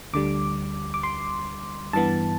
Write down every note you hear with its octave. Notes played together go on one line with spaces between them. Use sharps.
D2 D3 G3 D6
D6
C6
G2 E3 B3 A5